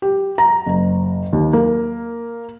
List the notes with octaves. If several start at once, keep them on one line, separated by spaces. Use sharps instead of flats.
G4
A#5
F#1
D#2
A#3